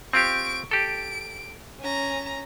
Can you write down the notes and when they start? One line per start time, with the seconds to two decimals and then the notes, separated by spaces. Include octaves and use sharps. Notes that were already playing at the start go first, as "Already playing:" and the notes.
0.13 C4 F4 G4 C#6 D7
0.71 G4 A4 D7
1.81 C#4 A#5